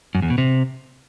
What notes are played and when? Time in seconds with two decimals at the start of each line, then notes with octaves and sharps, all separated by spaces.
0.15 F#2
0.22 E2
0.30 B2
0.38 C3